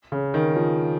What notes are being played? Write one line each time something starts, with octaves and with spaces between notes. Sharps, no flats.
C#3
D#3
F3